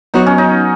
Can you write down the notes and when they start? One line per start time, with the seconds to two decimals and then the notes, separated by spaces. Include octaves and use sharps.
0.14 F#3 B3 D#4 F#4 C#5
0.26 C#4
0.38 D#4